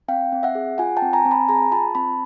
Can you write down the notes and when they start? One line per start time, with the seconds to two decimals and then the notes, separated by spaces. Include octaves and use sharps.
0.08 C4 F5 G5
0.32 C4
0.43 E5 F#5
0.55 G#4
0.78 F4 F#5 G#5
0.97 G5 A5
1.02 C4
1.13 G#5 A#5
1.25 C4
1.31 A5 B5
1.49 G#4 G#5 A#5
1.72 F4 A5 B5
1.95 C4 A5 B5